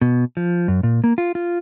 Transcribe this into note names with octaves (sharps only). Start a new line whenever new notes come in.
B2
F3
F#2
A#2
A#3
F4
F4